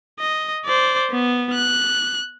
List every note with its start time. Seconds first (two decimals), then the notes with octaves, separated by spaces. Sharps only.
0.19 D#5
0.65 C5 D5
1.11 B3
1.54 F#6